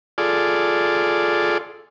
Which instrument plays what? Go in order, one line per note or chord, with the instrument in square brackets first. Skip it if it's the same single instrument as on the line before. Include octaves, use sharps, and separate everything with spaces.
[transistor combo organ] F4 G#4 A4 D5